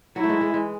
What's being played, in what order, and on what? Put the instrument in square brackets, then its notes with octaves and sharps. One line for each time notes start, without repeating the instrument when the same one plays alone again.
[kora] F#3 [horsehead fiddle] E4
[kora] A3
E3 G#3
E3 G#3
E3 G#3